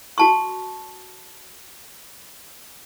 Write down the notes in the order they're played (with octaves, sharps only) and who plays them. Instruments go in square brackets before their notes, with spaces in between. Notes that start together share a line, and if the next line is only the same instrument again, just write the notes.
[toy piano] F#4 A5 C#6